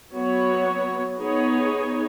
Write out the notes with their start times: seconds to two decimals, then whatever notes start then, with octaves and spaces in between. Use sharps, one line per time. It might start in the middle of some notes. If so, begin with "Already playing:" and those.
0.13 F#3 B3 F#4 C#5
1.17 B3 D#4 G#4 C#5